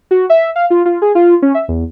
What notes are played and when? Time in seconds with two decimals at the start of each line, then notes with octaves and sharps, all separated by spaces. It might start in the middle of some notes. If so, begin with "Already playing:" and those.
0.11 F#4
0.30 E5
0.56 F5
0.70 F4
0.86 F4
1.02 G#4
1.15 F4
1.42 C#4
1.54 E5
1.68 E2